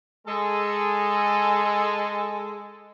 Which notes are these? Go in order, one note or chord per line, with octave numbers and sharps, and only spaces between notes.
G#3 A4